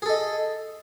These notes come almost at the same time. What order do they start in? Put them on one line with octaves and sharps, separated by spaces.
G#4 A4 D#5